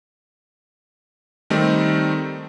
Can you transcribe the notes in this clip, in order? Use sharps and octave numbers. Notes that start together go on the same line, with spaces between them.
D#3 G3 A3 C4 D#4